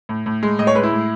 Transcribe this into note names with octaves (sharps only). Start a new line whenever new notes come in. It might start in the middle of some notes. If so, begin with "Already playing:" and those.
A2
A2
G#3
A2 D#5
C#5
G#3 B4
E4
A2